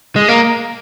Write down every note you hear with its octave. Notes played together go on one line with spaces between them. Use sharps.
G#3
A#3